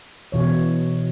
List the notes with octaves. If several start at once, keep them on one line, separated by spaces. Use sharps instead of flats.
B2 E3 C#5